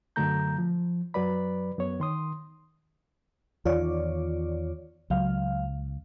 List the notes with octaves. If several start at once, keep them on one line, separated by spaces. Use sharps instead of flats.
F#2 D3 F#3 A3 A#5 G6
F3
F#2 F#3 B4 D5 B5
F#2 B3 C#5
D#3 C6 D#6
E2 D#3 F4 C#5 D5
C#2 F#3 F5